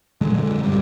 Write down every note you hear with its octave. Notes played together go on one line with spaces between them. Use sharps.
A#2 D3 F#3 G#3
F2 D3 G#3
B1 G2 G3